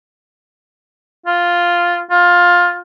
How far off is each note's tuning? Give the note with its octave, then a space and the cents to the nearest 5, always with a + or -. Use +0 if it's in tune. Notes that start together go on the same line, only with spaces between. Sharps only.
F4 +0
F4 +15